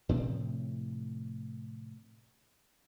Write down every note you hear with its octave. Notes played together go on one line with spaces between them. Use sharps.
A2 C3 F3 C4